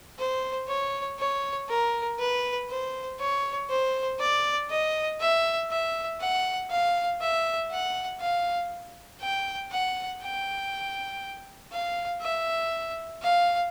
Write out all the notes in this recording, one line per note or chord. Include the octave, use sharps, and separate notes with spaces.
C5
C#5
C#5
A#4
B4
C5
C#5
C5
D5
D#5
E5
E5
F#5
F5
E5
F#5
F5
G5
F#5
G5
F5
E5
F5